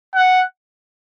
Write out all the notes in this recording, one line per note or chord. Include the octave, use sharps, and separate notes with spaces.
F#5